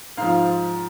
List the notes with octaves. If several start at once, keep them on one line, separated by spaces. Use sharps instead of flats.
G#2 F3 F5